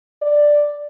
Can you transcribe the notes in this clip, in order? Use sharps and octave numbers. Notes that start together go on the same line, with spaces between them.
D5